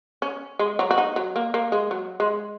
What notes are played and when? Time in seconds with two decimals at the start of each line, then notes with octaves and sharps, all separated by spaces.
0.22 C#4
0.59 G#3
0.79 F#3
0.91 F#4
0.98 D#4
1.16 F#3
1.36 A#3
1.54 A#3
1.72 G#3
1.91 F#3
2.20 G#3